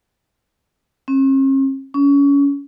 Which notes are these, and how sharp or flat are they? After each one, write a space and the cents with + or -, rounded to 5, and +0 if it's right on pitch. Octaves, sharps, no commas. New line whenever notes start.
C#4 -45
C#4 +25